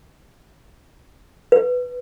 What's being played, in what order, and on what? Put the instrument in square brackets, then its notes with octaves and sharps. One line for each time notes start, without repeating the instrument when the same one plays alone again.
[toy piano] B4